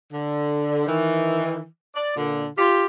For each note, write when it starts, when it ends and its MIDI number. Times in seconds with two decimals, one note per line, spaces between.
0.13 0.83 50
0.87 1.63 51
0.87 1.63 52
1.94 2.12 74
2.16 2.47 46
2.16 2.47 50
2.57 2.85 65
2.57 2.85 67